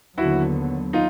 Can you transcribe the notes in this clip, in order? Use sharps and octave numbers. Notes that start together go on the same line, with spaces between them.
D#2 D3 F#3 B3 E4 F#4
D#4 F4